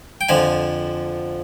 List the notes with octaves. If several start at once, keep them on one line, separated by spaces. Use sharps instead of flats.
G5
F2 D3 F3 G#5